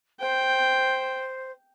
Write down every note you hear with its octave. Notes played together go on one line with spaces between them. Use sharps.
C5 G5